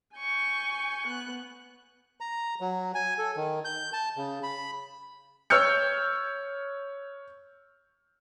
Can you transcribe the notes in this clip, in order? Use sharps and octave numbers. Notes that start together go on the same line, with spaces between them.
G#5 C#6 G6
B3 F#6
A#5
F#3
G#5
A4
D#3
G6
A5
C#3
B5
C#5 E6 F6 G6 C#7